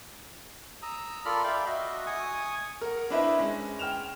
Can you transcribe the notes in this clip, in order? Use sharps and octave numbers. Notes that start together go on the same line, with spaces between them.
A#5 D#6 E6
F4 A4 A#4 D5 B5 F6
D5 E5 F5 G5 B5
F#4 D#5 E5
G#5 C#6 D#6
A#4 F#5
D4 E4 B4 C5 D#5 E5
G#3 C#4
G5 F6 E7 F7